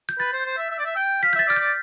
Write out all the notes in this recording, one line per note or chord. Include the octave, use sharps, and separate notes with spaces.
G6
B4 A6
C5
C5
E5
E5
D5
E5
G5
F5 B6
G6
E5 A6
D5 F6
G6
D5